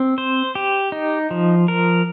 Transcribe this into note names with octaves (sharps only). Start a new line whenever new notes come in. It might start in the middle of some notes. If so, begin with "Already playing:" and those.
Already playing: C4
C5
G4
D#4
F3
A#4